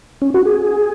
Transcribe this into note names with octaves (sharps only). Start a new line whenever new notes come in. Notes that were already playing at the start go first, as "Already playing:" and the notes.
C#4
F#4
G#4